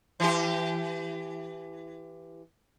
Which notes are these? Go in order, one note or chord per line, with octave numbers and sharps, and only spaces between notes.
E3 G4